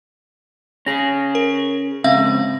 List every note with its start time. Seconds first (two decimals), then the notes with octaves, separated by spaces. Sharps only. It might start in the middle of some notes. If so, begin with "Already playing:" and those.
0.86 C#4 G#4 A#6
1.35 A#4
2.04 G#2 C#3 C4 E5 F5